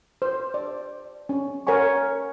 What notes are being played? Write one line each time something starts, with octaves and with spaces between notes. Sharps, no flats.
C5
D5
C#4
A#4 C#5 F#5 G#5 C#6